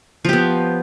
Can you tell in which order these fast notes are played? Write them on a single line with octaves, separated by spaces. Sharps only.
F3 G4 B3